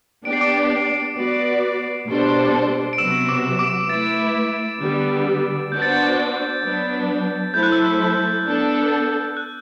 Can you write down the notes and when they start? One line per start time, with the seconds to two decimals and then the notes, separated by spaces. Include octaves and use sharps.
0.24 B3 D4 G4 D5 D7
0.33 C7
0.41 D6 D7
1.16 B3 F#4 B4 D5
2.08 B2 G3 D4 A4 C5
2.93 D7
2.98 C3 F#3 B3 F#4 E6 E7
3.29 D6 D7
3.59 D6 D7
3.89 A3 E4 B4 A6
4.81 D3 G3 B3
5.72 B3 D4 F#4 C5 G6
5.82 A6
5.92 G6
6.63 F#3 B3 D4
7.54 F#3 A3 E4 A4 C5 G6
7.63 F#6
7.72 E6
7.81 F#6
8.46 B3 D4 A4
9.37 F#6